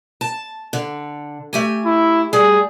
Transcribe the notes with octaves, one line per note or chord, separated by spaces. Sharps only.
A5
D3
A3 G4 G#5
E4
G3 G#4